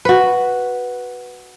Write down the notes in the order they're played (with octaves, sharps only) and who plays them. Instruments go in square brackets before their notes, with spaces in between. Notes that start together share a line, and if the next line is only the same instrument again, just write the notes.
[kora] F#4 B4